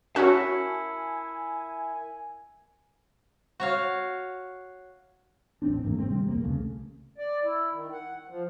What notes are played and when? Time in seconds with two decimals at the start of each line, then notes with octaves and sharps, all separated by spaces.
0.16 C#4 E4 F#4 A#4 G#5 A5 B6 C#7
3.60 F#4 C#5 F5
5.62 D#1 A1 C4 D4
5.83 G1 G#2 E3 A#3
5.95 G#3 C4
6.08 C3 D#3 G3 C4
6.27 A#1 E2 A#3
6.44 C2 C#3 A3
7.18 D5
7.44 E4
7.73 D#3
7.92 F#5
8.28 F3